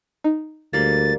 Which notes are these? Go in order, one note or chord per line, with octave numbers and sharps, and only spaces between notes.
D#4
D2 G3 A#3 A6